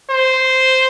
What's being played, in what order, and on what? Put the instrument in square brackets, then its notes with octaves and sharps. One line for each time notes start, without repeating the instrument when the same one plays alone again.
[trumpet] C5